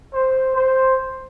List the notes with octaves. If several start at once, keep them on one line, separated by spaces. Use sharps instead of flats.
C5
C5